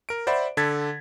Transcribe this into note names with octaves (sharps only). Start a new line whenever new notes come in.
A#4 D7
C5 D5 E5 F#5 B5
D3 A4 G#6 A6 B6